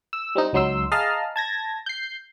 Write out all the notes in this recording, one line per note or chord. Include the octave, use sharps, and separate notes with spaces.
E6
G3 C4 D#4
C#2 F#3 D#4 C6 E6
G#4 D#5 F5 A5 A#5 F6
A5 G#6 A#6
G6 C7